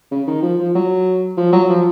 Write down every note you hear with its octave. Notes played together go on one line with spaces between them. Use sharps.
C#3
D#3
F3
F3
F#3
F3
F#3
F3